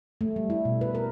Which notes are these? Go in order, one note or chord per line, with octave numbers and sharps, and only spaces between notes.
A3
G3
E4
B2
B4
A#4